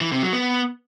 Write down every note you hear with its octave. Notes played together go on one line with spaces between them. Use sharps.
E3
C3
F#3
B3